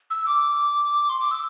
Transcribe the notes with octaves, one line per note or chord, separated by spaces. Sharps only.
E6
D6
C6
D6
E6